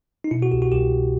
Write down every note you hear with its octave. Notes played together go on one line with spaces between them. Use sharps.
D#4
B2 E4
F#4
C2 G4
F#4
C2 G4
C2